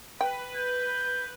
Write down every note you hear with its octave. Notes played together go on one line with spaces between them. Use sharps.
B4 G5
G6